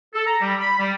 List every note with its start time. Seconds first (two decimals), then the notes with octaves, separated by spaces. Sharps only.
0.14 A4
0.27 A#5
0.41 G3
0.60 B5
0.79 G3